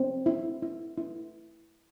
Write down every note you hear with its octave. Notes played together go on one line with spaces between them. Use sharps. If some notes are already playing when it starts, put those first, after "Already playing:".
Already playing: C4
E4
E4
E4